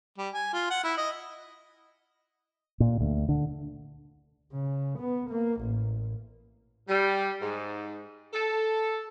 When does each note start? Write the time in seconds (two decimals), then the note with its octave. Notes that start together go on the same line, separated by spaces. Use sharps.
0.18 G3
0.34 G#5
0.53 F4
0.71 F#5
0.84 E4
0.98 D#5
2.80 A#2
3.01 D2
3.29 D3
4.52 C#3
4.99 B3
5.30 A#3
5.61 A1
6.88 G3
7.42 G#2
8.34 A4